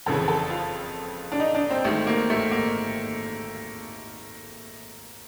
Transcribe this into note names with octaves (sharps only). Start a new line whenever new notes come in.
F#1 F2 C#3 E3 A4
A4
F4
D4
D#4
D4
C4
G#1 G#2 D#3 A3
A#3
A3
A#3